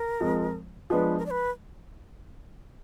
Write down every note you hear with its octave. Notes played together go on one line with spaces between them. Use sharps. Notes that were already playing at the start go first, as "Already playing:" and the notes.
Already playing: A#4
F2 F3 G#3
F3 G#3 B3 D4 B4
A#4
D5
B4